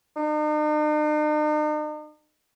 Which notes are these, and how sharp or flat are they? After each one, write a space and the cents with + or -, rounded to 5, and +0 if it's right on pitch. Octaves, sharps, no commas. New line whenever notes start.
D#4 -45